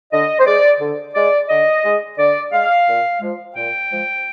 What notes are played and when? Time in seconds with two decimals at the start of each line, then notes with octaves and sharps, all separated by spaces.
0.12 D3 D#5
0.39 C5
0.46 G#3 D5
0.80 D3
1.15 G#3 D5
1.49 D3 D#5
1.84 G#3
2.18 D3 D5
2.52 G#3 F5
2.88 A#2
3.21 F3 G#3
3.56 A#2 G5
3.91 F3 G#3